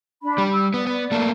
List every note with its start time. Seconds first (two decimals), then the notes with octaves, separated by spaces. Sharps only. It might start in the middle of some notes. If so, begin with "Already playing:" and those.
0.22 D4 B5
0.38 G3
0.52 E6
0.74 B3 D5
0.87 B3
1.12 A3 A#3 A4